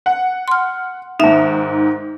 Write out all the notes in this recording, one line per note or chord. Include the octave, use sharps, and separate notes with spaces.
F#5
C6 F6
G#2 D#3 D#4 E5